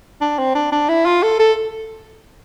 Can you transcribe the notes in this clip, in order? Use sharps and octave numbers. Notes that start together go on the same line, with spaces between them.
D4
C4
D4
D4
E4
F4
A4
A4